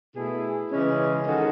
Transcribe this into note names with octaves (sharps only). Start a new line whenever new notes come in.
B2 A3 E4 G#4
C#3 E3 G#3 C#4
D#3 G#3 D#4 F#4 A4